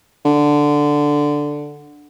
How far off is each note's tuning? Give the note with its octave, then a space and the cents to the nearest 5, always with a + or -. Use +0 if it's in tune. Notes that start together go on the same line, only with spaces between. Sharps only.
D3 +0